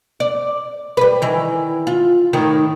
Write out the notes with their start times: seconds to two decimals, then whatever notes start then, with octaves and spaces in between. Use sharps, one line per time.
0.20 D5
0.97 G3 B4
1.22 D#3 E3
1.87 F4
2.33 A2 D#3 D#4